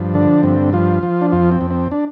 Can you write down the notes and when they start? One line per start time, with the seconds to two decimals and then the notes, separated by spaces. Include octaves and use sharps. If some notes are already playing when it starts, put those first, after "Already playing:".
Already playing: G2 F3
0.14 D3 D4
0.43 G2 C4
0.73 F3 F4
1.03 F3
1.21 D4
1.32 F2 F4
1.52 C4
1.61 F2
1.71 C4
1.91 D4